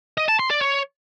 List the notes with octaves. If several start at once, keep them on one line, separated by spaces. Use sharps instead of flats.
D#5
A5
C6
D5
C#5